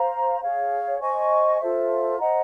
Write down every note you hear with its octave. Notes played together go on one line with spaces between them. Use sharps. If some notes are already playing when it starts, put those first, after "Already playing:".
Already playing: C5 F5 A#5
G#4 C#5 F5
C5 D#5 G#5 C#6
F4 A4 C5 E5
C5 D#5 F#5 A#5